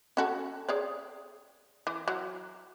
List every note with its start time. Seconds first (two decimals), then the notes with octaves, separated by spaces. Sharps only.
0.17 C#4 F#4 A4
0.69 G#4 C#5 D5
1.87 E3
2.08 F#3